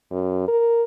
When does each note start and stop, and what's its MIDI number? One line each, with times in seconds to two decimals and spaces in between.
0.11 0.44 42
0.48 0.83 70